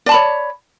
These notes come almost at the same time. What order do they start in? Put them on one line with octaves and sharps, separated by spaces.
D5 A5 B5 C#5